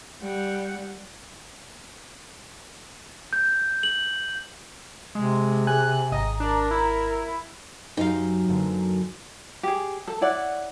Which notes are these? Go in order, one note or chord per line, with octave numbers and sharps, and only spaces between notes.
G3 F#5
G6
F#7
C3 G#3
G#4 G#5 F#6
G#1 D#5 A#5
D4 A#4
E4
F#2 D#4 G4 F5
F#2 D3 A#3
G4 G#4
A4
E4 C#5 D5 F#5